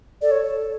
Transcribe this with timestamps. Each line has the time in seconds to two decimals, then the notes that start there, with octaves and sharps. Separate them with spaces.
0.22 A4 D5
0.31 C#5